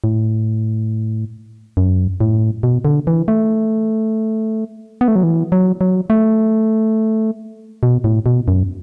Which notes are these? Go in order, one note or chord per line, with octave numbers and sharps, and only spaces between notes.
A2
F#2
A2
B2
D3
E3
A3
B3
A3
F#3
E3
F#3
F#3
A3
B2
A2
B2
F#2